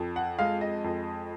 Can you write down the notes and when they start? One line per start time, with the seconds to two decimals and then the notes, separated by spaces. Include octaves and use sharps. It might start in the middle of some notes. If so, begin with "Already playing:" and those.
Already playing: F2
0.16 F#5
0.39 G#3 F5
0.61 D#5
0.84 F2